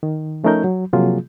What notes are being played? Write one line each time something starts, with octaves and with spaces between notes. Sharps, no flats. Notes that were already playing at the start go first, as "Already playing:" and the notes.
D#3
F3 A3 C#4 D#4 A#4 G6
F#3
C3 F3 F#3 A#3 F4 G#4